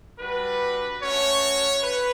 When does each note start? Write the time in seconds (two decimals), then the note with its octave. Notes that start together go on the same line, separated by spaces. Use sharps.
0.18 G3 D4 F#4 B4
1.00 A3 C#4 F#4 C#5
1.82 B4